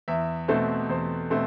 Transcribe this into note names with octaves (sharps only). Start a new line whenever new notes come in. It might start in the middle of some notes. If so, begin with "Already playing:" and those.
E2 E5
B2 A3 C4 C5
E2 C5
B2 A3 C4